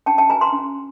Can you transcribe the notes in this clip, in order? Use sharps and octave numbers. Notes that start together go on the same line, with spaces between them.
C#4 G5 A5
G5 A5
F#4 B4 G#5 A#5
A#5 C6
C#4